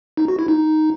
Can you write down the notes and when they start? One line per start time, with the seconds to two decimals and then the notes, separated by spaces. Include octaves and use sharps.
0.17 D#4
0.28 F#4
0.39 E4
0.48 D#4